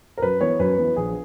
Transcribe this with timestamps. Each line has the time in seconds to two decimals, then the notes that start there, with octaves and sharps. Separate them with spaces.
0.18 A#4
0.22 F#2 B4
0.41 E3 B3 C#5
0.59 F#2 B4
0.78 E3 B3
0.96 A#1 G#4